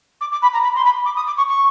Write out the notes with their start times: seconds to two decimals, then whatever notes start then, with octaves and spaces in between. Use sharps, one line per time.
0.20 D6
0.32 D6
0.42 B5
0.53 A#5
0.63 B5
0.75 C6
0.84 B5
1.05 D6
1.16 D#6
1.26 D6
1.37 C#6
1.48 C#6